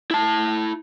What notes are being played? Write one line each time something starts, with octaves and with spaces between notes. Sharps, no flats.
E4 A5